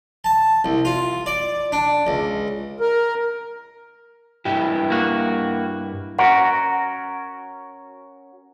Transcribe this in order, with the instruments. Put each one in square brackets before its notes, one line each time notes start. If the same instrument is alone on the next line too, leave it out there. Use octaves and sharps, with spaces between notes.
[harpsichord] A5
C2
F4
D5
D4
C#2
[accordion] A#4
[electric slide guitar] G2 E4 G4
[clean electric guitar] A#3 F#4
[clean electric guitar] C#4 F#4 A#4 [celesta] F#5